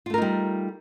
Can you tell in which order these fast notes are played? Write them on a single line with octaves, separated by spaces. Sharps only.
F4 A3 A#4 D#4 G3